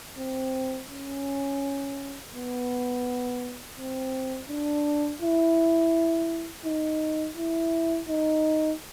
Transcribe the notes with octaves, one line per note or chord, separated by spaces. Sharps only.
C4
C#4
B3
C4
D4
E4
D#4
E4
D#4